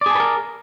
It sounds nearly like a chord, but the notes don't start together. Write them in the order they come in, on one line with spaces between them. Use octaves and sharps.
D5 G#4 A5 B4 A#4